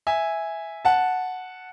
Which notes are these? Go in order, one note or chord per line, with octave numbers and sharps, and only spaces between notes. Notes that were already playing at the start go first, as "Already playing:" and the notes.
E5 G#5
F#5 A5